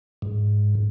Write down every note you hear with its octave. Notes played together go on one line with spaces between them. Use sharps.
G#2